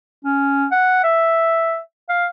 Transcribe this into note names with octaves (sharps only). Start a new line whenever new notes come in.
C#4
F#5
E5
F5